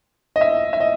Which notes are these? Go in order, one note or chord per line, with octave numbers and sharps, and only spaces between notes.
D#5
E5
E5
D#5